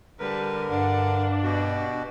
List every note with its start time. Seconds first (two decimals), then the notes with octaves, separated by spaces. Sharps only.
0.19 D3 G3 A#4 B4 A5
0.70 G2 D4 D5 F#5
1.43 B2 F#4 G4